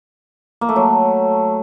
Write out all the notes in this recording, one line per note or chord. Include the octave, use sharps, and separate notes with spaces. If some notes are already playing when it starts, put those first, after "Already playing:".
A#3
A3
F#3